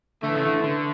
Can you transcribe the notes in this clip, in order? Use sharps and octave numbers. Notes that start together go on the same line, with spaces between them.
A2 D3 E3 A3
C#3
D3
D3